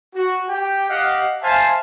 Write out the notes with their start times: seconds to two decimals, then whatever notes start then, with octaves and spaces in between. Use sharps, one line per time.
0.14 F#4
0.48 G4 G5
0.88 G4 D#5 F5 F#5
1.41 C5 E5 F5 G#5 A5